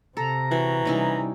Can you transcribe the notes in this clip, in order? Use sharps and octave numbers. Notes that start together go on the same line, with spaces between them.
C3 A4 A#5
E3 F#4
C3 G3 C#4 D#4 E4